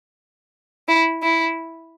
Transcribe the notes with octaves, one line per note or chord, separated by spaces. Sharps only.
E4
E4